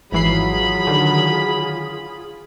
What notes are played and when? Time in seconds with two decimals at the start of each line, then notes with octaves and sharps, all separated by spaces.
0.12 G#1 E3 F#3 F4 G#4 B5 C7
0.87 D3 D#3